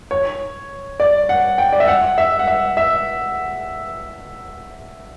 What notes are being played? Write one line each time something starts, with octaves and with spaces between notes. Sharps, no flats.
C#5
D5
F#5
G5
D5
E5
F#5
E5
F#5
E5
E5